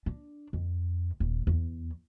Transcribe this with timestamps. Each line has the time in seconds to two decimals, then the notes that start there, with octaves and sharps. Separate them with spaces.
0.06 D4
0.53 F2
1.20 D#1
1.47 E2